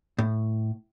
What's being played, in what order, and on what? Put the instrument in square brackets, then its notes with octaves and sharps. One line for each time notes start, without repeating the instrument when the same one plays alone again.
[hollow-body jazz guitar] A2